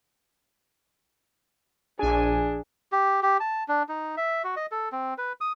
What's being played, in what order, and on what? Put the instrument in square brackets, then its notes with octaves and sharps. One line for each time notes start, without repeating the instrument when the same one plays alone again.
[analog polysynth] A#1 G#5 [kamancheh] D4 [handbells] G#4
[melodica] G4
G4
A5
D4
D#4
E5
F#4
D#5
A4
C4
B4
D#6